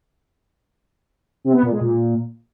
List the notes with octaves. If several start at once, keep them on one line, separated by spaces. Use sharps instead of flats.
C3
B3
A#2
G#3
A#2